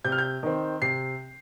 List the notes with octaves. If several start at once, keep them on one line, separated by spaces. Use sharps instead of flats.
C3 G6
F6
G6
D#3 C4
C3 C7